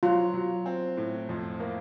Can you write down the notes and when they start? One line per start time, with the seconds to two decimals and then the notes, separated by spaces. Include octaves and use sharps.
0.03 F#3 F4
0.34 F#3
0.66 C4
0.97 A2
1.29 F2
1.60 A#3